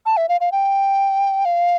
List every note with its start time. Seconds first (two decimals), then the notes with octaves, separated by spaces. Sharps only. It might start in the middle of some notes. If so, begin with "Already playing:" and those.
0.06 A5
0.17 E5
0.29 F5
0.41 F5
0.52 G5
1.45 F5